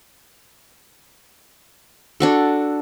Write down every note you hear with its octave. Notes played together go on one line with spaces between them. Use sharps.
D4 F#4 A4